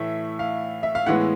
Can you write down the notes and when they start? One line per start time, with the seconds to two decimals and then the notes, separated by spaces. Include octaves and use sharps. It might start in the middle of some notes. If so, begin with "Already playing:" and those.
Already playing: A2 E3 A3 E5
0.39 F5
0.83 E5
0.95 F5
1.06 A2 E3 G#3 B3 F#5